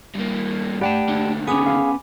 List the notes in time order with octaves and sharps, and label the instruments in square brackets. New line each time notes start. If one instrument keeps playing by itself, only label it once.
[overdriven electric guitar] G2 A#3
[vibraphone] A3 [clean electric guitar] G4 G5 A5 [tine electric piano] D5 F#5 B5
[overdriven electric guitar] D#2 D3
[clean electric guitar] B3 C#4 [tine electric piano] G#4 D#6 [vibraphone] G#5 B5 D6
[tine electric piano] G#4 F5